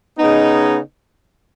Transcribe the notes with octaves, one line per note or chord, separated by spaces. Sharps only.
C#3 B3 D#4